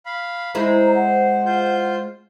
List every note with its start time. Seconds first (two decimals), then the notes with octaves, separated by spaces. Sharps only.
0.06 F5 B5
0.55 G#3 C4 E4 C5 A#5
0.95 F#5
1.46 F4 C5 G6